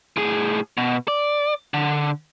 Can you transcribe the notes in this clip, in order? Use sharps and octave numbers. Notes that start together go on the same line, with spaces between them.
A2 G#4
B2
D5
D3